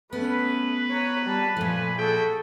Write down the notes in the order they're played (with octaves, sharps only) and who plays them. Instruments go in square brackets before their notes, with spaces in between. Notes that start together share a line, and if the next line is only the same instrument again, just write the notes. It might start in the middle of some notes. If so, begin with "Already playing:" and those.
[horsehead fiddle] A3 C#4 [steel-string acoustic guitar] B3 [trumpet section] B4
[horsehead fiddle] C#5 A#5
G3 A5
[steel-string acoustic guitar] A#2 F3 [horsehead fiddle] A3 G#5
[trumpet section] E4 F#4 G5 [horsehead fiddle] G#4 A4